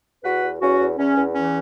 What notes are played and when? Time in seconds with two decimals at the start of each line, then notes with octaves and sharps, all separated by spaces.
0.23 E2 F#4 B4
0.43 E2
0.60 E2 C#4 F#4
0.79 E2
0.97 E2 C#4
1.16 E2
1.34 E3 C#4